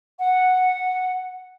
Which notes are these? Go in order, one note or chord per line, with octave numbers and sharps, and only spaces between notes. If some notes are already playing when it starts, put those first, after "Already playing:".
F#5